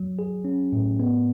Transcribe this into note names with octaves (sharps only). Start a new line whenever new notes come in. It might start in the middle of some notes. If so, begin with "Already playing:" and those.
Already playing: F#3
G#4
C#4
A2
B3